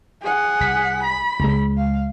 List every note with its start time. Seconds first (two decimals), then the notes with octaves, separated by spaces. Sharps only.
0.22 G#4 F#5
0.60 C2 B6
1.04 B5
1.40 C#2 G#3
1.77 F5